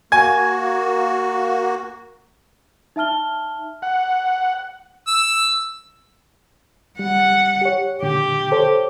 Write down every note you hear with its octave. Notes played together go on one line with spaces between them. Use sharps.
A#3 F#4 G#5 G#6
D#4 E5 A5 F6 G7
F#5
E6
G3 F#5
G4 C#5
A#2 D3 G4
A4 C5 C#5